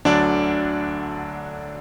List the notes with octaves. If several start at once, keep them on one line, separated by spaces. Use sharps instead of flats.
D2 D3 F#3 D4 D5